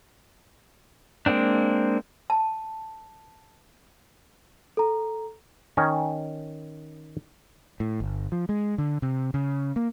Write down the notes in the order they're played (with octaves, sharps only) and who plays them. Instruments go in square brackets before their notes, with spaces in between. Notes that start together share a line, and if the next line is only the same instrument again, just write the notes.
[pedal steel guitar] G#3 A#3 C4 D4
[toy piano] A5
[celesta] A4 A#5
[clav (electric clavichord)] D#3 C#4 G#5 A#5
[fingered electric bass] A2
G1
F3
G#3
D3
C3
C#3
A#3